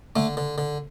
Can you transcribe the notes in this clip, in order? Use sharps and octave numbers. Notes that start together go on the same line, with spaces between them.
D3 A3
D3
D3